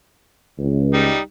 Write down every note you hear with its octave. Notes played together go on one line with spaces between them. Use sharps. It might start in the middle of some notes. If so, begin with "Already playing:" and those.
C#2
G3 D#4